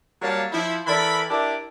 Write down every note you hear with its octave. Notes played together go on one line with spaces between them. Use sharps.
F#3 G3 A#3 C#5 F5 A5
F3 E4
E3 A4 A#4 D5 B5
D4 E4 G4 A#4 D5